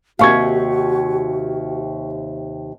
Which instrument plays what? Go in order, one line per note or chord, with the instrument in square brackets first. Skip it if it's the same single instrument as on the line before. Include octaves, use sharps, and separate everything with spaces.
[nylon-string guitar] D#2 C3 [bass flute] F#4 [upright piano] F5 C#6 G#6